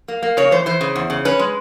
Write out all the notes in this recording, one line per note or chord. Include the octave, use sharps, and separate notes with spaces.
A#3
A#3
C#3 C#5
E3 C5
E3 C5
C#3
E2
C#3
C#4 B4
G#3